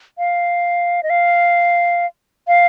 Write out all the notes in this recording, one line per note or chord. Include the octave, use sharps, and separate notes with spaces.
F5
D#5
F5
F5